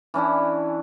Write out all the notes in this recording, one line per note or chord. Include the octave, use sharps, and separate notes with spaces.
E3 C#4 D4 E4